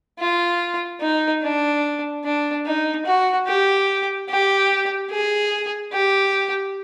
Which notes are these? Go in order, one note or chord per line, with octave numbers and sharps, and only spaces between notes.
F4
D#4
D4
D4
D#4
F#4
G4
G4
G#4
G4